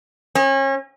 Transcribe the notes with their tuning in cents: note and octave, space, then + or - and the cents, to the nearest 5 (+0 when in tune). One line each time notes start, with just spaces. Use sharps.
C#4 -35